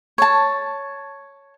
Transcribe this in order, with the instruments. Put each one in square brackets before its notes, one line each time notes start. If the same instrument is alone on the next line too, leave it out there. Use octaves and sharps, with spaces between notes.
[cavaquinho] C#5 A5